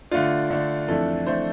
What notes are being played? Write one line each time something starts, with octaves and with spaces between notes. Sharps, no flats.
D3 A3 D4 F4
D3 A3 D4
F2 E3 A3 D4 A4
F2 E3 A3 D4 C5